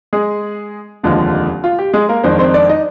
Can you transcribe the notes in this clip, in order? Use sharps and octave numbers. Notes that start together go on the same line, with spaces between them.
G#3 G#4
F1 D#2 D3 F3 G#3
F4
G4
G#3 G#4
A#3 A#4
F2 D#3 G#3 C4 D4 C5
C4 C5
D4 D5
D#4 D#5